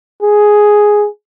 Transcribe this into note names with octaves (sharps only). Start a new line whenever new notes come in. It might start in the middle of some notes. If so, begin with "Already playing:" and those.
G#4